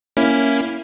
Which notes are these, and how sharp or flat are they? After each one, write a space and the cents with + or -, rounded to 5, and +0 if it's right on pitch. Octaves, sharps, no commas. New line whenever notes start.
A#3 +0 C#4 +0 E4 +0